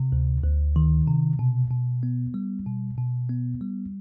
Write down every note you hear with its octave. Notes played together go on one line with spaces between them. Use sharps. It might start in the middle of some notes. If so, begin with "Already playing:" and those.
Already playing: C3
D2
D2
D#3
C3
B2
B2
B3
G3
B2
B2
B3
G3